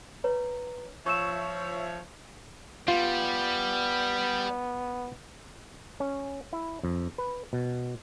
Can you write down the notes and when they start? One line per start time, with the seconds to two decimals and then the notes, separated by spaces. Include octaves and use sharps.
0.24 B4 C#5 A#5
1.06 F3 C#5 E5 C#6 E6 E7
2.88 G3 B3 F4
6.00 C#4
6.53 E4
6.84 F2
7.18 B4
7.53 B2